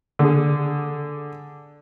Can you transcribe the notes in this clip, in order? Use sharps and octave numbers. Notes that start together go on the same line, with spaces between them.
D3 G#4